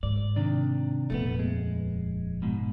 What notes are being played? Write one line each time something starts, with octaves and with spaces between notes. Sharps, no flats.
G#2 D5
C3 D#3 D4
D#1 F2 A3 B3
G#3
G#2 B2